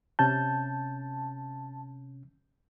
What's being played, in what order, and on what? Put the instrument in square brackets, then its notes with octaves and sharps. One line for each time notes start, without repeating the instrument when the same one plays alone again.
[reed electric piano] C3 C#4 G6 [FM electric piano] A5